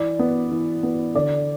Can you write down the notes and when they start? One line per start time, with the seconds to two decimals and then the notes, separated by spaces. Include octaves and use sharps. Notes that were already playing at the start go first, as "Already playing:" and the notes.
Already playing: E3 D5
0.19 B3
0.51 E3
0.83 B3
1.15 D3 D5